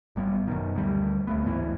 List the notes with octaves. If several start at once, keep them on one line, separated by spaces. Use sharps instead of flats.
G#1 G3 B3
F#2 B2 D#3
D2 G3
D2 A3 B3
D1 D2 G#2 E3